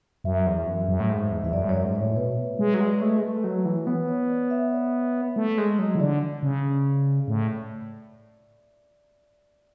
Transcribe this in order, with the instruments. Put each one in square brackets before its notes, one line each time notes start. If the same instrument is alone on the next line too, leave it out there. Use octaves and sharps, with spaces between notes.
[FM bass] F#2 [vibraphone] E5
[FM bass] E2
F#2
F#2
A2
G#2
E2
[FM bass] E2 [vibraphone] E5
[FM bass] F#2 [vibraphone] D5
[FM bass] G#2
[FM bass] F#2 [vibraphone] C#5
[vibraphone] D5
[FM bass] G#2
[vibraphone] C#5
[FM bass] A2
[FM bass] B2 [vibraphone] B4
[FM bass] G#3
F#3
G#3
A3
G#3
A3
[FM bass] F#3 [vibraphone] C#5
[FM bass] E3 [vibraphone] B4
[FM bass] B3 [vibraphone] B4
[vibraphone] C#5
D5
E5
D5
[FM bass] A3
G#3
F#3
E3
[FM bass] D3 [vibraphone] D5
[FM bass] C#3
A2